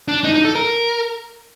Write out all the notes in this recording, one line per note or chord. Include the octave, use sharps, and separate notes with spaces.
D4
D#4
D#4
A4
A#4